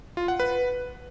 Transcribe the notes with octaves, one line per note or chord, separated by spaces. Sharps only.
F4
F#5
B4